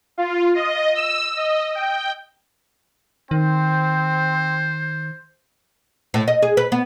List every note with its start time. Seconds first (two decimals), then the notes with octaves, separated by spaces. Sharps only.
0.18 F4
0.55 D#5
0.95 E6
1.37 D#5
1.75 G5
3.31 D#3 C4 C5
6.14 A2
6.28 D#5
6.42 G#4
6.57 B4
6.72 B3